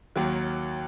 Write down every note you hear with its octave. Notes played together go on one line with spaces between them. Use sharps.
D#2 D#3 F#3